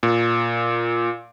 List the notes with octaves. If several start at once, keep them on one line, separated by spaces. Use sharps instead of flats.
A#2